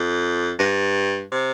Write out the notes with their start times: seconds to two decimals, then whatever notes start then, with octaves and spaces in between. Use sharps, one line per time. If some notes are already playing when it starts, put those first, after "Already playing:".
Already playing: F2
0.59 G2
1.32 C3